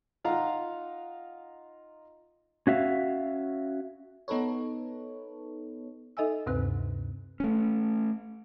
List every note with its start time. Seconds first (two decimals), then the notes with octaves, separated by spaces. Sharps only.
0.24 D#4 F4 F5 F#5 A#5
2.67 C#4 F#4 E5 F5
4.28 B3 D#4 A4 B4 C#5
6.17 D#4 A4 D#5 E5 G#5 E6
6.46 D2 G2 C3 C4 B4 F#6
7.40 A3 C#4